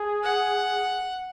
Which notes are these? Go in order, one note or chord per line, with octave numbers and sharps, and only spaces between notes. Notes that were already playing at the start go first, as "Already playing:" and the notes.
Already playing: G#4
F#5